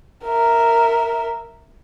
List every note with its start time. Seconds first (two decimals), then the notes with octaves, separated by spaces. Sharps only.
0.24 A#4 E5